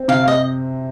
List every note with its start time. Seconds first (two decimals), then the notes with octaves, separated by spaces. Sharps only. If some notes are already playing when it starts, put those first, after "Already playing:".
Already playing: C4
0.08 C3 F5
0.28 D#5